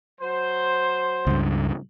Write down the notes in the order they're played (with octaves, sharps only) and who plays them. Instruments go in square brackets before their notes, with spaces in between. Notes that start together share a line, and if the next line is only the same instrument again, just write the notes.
[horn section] F#3 C5
[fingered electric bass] C#2 G2